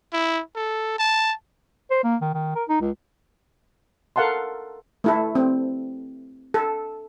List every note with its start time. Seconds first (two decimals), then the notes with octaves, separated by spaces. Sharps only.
0.13 E4
0.56 A4
0.99 A5
1.90 C5
2.04 A#3
2.21 D#3
2.34 D#3
2.55 A#4
2.69 D#4
2.81 C#2
4.16 A4 A#4 F5 F#5 A5 C6
5.04 A3 E4 A4
5.35 C4
6.54 A4